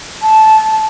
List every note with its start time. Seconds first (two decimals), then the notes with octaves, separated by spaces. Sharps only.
0.22 A5